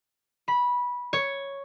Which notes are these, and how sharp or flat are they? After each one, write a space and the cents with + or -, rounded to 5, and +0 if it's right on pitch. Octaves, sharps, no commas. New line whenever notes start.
B5 -15
C#5 +0